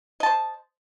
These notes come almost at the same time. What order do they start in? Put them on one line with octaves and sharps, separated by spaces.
D#5 A5 C5